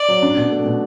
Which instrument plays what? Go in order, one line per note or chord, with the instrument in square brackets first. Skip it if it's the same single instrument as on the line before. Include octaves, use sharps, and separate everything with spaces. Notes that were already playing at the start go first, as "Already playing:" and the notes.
Already playing: [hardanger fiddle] D5
[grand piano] F#3
D4
B2
A3
B2